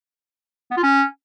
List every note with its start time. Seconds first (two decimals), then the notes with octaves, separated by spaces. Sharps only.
0.71 B3
0.77 F4
0.83 C#4